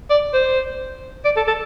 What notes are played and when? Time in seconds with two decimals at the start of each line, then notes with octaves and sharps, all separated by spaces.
0.10 D5
0.33 C5
1.25 D5
1.37 A4
1.47 A4